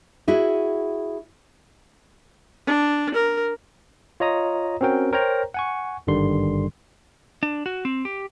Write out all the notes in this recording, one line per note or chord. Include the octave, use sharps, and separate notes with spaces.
E4 F#4 G#4
D4
A#4
F4 C#5 D#5 A#5 D#6
C4 C#4 F#4 A#4 G5
A#4 C5 C#5 G5 A#5
F#5 G#5 C#6
G#1 G2 D3 D#3 G3 C6
D4
F#4
C4
G4